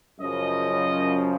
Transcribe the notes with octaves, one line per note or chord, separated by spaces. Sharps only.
F#2 C#3 F3 D#5